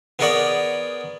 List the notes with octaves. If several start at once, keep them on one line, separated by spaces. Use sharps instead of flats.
B3 G#4 A#4 C#5 D5 F#5